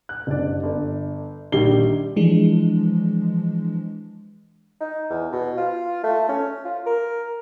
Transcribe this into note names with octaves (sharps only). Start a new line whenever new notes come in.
F#6
F#1 G2 D5
G1
A#1 D#3 G3 D4 C7 G7
E3 F3 G#3 D4
D#4
E2
B2
F4
A3
C#4
F4
A#4